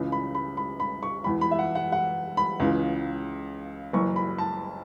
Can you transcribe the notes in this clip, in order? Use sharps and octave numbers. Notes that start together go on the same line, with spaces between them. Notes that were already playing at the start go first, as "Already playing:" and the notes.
Already playing: C#2 C#3 E3
B5
B5
B5
B5
C#6
E1 E2 E3 B5
B5
E5
F#5
F#5
F#5
B5
C#2 C#3 E3
F#1 F#2 E3 C#6
B5
A5